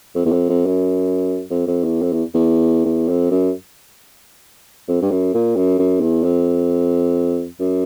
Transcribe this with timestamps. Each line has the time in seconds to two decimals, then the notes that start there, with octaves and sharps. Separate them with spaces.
0.15 F2
0.26 E2
0.32 F2
0.49 F2
0.66 F#2
1.50 F2
1.67 F2
1.85 E2
2.02 F2
2.13 E2
2.34 E2
2.85 E2
3.09 F2
3.31 F#2
4.88 F2
5.01 G2
5.11 F#2
5.34 A#2
5.56 F#2
5.79 F#2
6.01 E2
6.24 F2
7.60 F#2